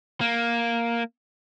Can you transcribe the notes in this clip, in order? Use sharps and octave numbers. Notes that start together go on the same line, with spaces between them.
A#3